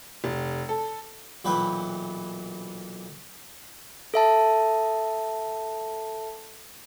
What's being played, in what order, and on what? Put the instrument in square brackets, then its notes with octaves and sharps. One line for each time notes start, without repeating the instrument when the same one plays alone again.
[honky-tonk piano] F1
A4
[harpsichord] B1 A#2 E3 B4 G5
[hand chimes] A4 E5 A5